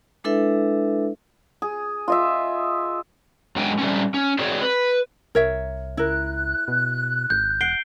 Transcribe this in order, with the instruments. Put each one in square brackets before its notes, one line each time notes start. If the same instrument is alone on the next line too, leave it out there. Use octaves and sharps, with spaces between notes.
[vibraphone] G#3 D4 E4 A4 B4 E5
[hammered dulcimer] G#4
F4 D#5 E5
[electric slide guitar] F#2 F#3 G#3 D4 G5 G#5
G3 A3 C4 C#4
C#4
C4 F#4 G#4 C#5 D5
B4
[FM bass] C2 [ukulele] A#4 C#5 E5
[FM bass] C#2 [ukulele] E4 A#4 [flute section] F#6
[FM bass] B2
[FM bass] G#1 [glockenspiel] G6
[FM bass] E1 [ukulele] F#5 [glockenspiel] C7 D7 G7